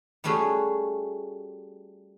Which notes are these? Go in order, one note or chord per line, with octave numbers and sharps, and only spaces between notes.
G3 A3 C#4 F#4 G#4